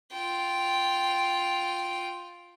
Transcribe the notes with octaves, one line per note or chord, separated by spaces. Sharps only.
F4 G5